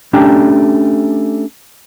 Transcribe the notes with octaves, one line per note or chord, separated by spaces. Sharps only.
A3 C#4 D4 G4 G5 A#5